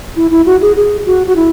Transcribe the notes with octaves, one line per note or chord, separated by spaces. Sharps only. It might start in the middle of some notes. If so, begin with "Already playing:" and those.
E4
E4
F#4
G#4
G#4
F#4
F#4
E4